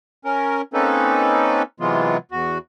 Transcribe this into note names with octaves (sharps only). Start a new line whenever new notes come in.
C#4 A#4
A#3 C4 C#4 D#4 A4 B4
C3 E3 F#3 G#3 B3 F4
E2 F#4